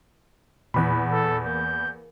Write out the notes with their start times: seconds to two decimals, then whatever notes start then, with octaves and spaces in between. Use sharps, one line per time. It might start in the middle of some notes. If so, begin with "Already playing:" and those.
0.74 E2 A#2 F#5 B5
1.12 A4
1.46 A#3 G6